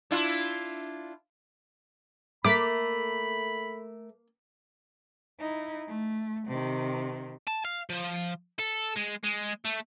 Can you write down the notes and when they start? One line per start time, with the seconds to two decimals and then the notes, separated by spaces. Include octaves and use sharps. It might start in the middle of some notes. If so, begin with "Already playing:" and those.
0.11 D4 E4 F4
2.45 A3 A#3 A#4 B5 D6 B6
5.39 D#4 E4
5.87 A3
6.48 C3 D#3
7.48 A5
7.65 F5
7.90 F3
8.59 A4
8.97 G#3
9.24 G#3
9.65 A3